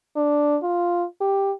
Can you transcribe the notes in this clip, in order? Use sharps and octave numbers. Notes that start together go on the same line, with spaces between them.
D4
F4
G4